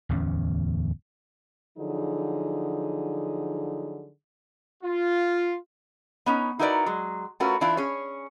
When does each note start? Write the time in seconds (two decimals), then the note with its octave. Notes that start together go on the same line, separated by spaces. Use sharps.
0.09 D1 E2 C#4
1.78 D3 F3 F#3 D#4 G#4
4.84 F4
6.26 B3 C#4 D#4
6.59 D#4 E4 F#4 A#4 B4 D5
6.86 F#3 G#3
7.40 A3 C#4 F4 F#4 A#4 B4
7.61 E3 D4 E4 F4
7.77 C#4 G#4 C#5